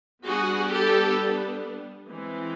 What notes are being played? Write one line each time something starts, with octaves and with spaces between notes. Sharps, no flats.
G3 B3 D4 F#4 G#4
G4 A4
E3 G#3 C4